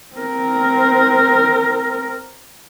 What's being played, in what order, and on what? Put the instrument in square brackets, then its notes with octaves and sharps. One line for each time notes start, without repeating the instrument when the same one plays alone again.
[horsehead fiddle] C4 A#4